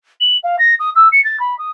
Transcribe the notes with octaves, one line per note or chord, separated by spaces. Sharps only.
F#7
F5
A#6
D#6
E6
C#7
A6
B5
D#6